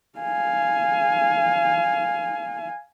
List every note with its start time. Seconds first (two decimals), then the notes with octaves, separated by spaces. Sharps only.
0.19 F5 G#5